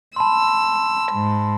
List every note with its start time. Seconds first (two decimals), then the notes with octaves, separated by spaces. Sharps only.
0.16 A5 B5 C6 E6
1.14 G#2